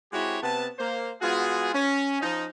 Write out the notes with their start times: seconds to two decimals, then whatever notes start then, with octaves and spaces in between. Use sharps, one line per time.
0.13 G#3 C4 E4 F#4 G4 C#5
0.42 C3 B3 A5
0.79 A#3 C5
1.21 G#3 B3 F4 F#4 G#4
1.74 C#4
2.21 F3 D#4